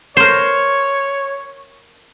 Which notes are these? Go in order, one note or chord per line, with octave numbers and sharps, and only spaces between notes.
A#4 C5 C#5